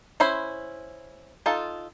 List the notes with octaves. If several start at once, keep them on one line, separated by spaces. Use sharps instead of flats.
C#4 E4 C5 B5
D#4 F4 A4